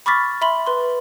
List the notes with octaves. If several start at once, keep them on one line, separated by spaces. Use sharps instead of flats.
B5 C#6 D6 F6 A6 B6
E5 B5 C6 F#7
B4 C6